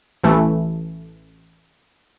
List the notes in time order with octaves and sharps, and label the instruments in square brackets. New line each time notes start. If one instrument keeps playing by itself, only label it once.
[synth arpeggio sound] A1 E3 A3